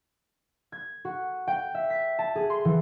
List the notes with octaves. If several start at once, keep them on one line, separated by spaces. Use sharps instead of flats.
G#6
F#4
G5
E5
B6
A5
G#4
C6
E3